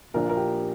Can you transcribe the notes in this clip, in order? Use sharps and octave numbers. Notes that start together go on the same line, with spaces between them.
A#1 A#2 F3 D4 A#4
A#4
G4